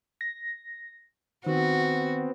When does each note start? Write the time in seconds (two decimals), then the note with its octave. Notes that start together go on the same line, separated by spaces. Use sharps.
0.21 A#6
1.46 D#3 B3 C4 F#4